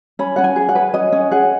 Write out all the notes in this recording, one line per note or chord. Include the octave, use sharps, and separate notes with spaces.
C#4 B5
C#4 F#5
G#5
G#4
F#5
B4
C#4 D#5
C#4
G#4 F#5